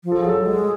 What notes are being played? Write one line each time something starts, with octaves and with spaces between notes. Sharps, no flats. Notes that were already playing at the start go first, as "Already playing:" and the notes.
F3
A4
G#4
F#3 A4
G#3